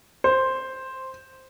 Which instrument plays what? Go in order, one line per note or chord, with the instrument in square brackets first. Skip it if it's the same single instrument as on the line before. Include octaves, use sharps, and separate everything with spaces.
[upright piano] C5